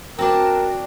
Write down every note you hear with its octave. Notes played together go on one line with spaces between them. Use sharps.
C4 D4 F#4 A#4 A5